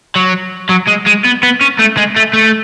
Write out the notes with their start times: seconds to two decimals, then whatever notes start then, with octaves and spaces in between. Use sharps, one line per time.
0.16 F#3
0.70 F#3
0.88 G#3
1.07 G#3
1.25 B3
1.43 B3
1.61 C#4
1.79 A3
1.97 G#3
2.16 A3
2.33 A3